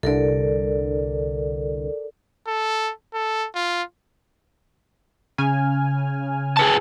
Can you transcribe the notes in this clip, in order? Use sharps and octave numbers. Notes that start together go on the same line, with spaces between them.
C2 D3 A4 A#4 D5
A4
A4
F4
C#3 G#5 F6
G#4 B4 A5